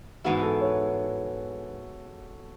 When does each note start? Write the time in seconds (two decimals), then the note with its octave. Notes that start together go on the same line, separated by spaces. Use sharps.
0.24 G#2 E3 B3 E4 F#4
0.43 A4
0.61 C#5